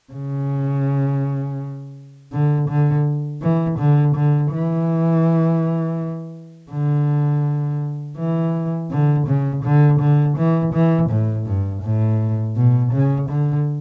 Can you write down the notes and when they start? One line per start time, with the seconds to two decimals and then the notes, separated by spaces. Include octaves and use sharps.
0.13 C#3
2.32 D3
2.69 D3
3.42 E3
3.79 D3
4.15 D3
4.52 E3
6.71 D3
8.17 E3
8.91 D3
9.27 C#3
9.64 D3
10.00 D3
10.37 E3
10.74 E3
11.10 A2
11.47 G2
11.83 A2
12.56 B2
12.93 C#3
13.29 D3